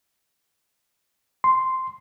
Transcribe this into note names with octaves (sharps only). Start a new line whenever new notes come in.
C6